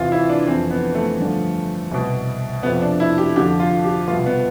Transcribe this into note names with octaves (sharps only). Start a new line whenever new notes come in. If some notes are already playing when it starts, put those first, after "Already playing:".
Already playing: E2 C3 E3 F4
E4
D4
F2 E3 C4
B3
A3
G2 D3 F3
C2 B2
F2 C3 F3 B3
D4
E4
G4
F2 D3 F3 G4
F4
G4
C2 B2 F4
B3